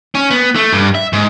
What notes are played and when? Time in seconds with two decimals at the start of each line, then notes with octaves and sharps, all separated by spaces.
0.15 C#4
0.31 B3
0.55 A3
0.72 G2
0.95 E5
1.13 G#2